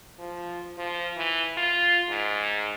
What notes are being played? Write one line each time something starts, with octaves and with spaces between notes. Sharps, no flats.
F3
F3
E3
F4
G#2